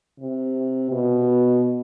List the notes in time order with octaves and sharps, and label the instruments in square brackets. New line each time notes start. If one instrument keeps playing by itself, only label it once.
[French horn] C3
B2